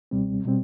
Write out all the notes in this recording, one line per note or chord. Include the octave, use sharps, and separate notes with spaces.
C#2 B2 G3 C4
B2 G3 C4